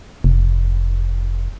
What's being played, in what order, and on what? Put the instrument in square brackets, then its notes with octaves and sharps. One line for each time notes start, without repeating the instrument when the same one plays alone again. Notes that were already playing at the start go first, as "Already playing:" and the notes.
[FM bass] F1